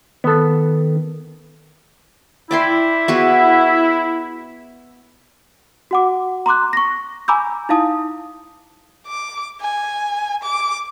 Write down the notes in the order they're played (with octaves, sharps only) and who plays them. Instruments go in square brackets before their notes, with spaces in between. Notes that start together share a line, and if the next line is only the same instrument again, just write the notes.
[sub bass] D#3 [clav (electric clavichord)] B3 A4
[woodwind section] E4 [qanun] D5 G5 C6
[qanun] B3 F#4 G#4
[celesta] F#4 F#5 D6
A#5 C6 D6 F#6
C#6 A#6
G#5 A#5 B5 D6 E6 G6
D#4 E4 F5 A5 D#6
[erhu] D6
G#5
D6